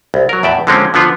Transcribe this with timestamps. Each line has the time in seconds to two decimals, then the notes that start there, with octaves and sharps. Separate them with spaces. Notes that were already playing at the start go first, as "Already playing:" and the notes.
0.14 C2
0.29 F#3 A#4
0.43 E2 A2 D5 E5 G5
0.67 D3 F3 G#3 A#3 C4 C#4
0.94 D3 F3 B3 F4